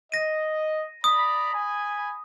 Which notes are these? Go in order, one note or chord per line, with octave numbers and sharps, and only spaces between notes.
D#5 A#6 D#7
D5 A#5 B5 D#6
G#5 B5